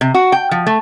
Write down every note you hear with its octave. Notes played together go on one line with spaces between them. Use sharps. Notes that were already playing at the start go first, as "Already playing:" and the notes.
C3
F#4
G5
F3
A3